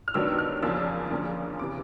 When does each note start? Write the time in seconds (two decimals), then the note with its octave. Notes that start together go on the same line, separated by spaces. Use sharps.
0.08 F6
0.14 G2 D#3 F#3 B3 D4 E6
0.39 F6
0.62 E2 C#3 F3 A#3 D4 E6
1.11 D2 C#3 F3 A#3
1.59 C3 E3 D6